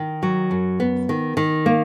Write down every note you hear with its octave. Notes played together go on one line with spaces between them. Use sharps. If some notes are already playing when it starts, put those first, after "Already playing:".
Already playing: D#3
F#3
F#2
B3
D#3
D#3
A#3